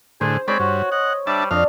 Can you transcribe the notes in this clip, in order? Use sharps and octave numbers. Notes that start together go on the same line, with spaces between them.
A2 D3 G#4 C5
G#3 C4 C#5 D5 B5
G2 F#4
D#5 F#5
G3 D4 E5 A5
F2 D4 D#5 F5